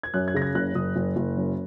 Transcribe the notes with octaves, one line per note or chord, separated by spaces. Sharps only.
G#6
F#2 F#6
G#6
C#3 A#6
G#6
F#1 F#6
F#1 D#6
F#1
F#1
F#2